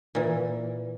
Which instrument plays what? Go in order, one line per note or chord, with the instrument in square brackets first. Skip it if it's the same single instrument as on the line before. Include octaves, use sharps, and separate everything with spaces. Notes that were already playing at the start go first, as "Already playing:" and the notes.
[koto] A#2 E3